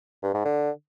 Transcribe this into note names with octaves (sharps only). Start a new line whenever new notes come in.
G2
G#2
D3